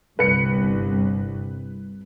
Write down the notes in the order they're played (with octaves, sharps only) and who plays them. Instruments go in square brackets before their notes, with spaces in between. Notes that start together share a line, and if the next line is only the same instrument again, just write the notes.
[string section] G1 C2 [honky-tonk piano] B4 C#7